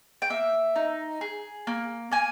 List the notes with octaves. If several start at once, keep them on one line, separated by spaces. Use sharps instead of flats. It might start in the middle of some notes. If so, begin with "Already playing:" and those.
G5
A#3 E5
D#4
G#4
A#3
A#3 G#5